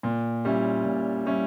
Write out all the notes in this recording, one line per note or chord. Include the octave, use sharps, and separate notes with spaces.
A#2
G3 C#4 E4
A#2
G3 C#4 E4